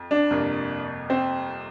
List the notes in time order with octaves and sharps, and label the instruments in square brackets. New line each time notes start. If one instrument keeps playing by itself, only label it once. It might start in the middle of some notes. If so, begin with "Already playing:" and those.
Already playing: [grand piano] F2
[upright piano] D4
[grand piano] G1 F2 C3 A#3
[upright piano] C4